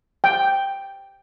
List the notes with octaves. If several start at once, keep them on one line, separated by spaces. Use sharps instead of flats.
G5